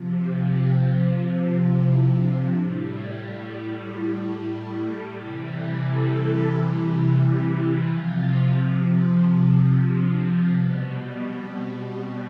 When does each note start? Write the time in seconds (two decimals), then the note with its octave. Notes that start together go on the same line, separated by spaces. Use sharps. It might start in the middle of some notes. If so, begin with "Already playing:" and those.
Already playing: C3 F3
0.14 G4
0.49 G4
1.15 F4
1.82 E4
2.16 D4
2.49 A2 G3 D4
2.83 E4
3.16 F4
3.50 G4
3.83 F4
4.17 A4
4.51 G4
4.84 A4
5.17 C3 E3 G3 G4
5.51 A4
5.85 A4
7.86 C3 F3 F4
9.87 D4
10.54 B2 G3 B3
11.22 C4
11.55 C4
11.88 C4